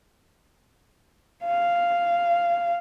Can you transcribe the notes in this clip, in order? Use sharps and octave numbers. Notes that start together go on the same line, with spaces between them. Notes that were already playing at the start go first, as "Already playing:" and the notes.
F5